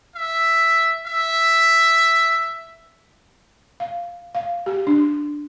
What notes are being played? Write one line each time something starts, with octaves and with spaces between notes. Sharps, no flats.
E5
E5
F5
F5
G4
D4